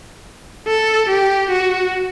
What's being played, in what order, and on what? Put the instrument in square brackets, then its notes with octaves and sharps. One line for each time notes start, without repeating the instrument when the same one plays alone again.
[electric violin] A4
G4
F#4